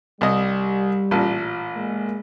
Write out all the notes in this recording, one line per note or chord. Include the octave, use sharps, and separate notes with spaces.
C2 G3 D#5
A1 A#2 A5
G#3 A#3